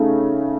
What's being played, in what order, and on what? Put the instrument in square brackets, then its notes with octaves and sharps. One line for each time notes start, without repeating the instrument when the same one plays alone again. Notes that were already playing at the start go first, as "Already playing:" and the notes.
Already playing: [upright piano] C#3 A3 [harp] D#4